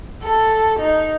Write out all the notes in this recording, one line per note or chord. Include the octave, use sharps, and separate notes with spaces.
A4
D#4